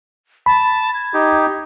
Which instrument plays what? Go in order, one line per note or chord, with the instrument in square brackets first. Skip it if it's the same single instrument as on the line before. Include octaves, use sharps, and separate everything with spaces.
[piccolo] A5 [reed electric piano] B5
[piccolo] G#6
[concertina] D#4 G4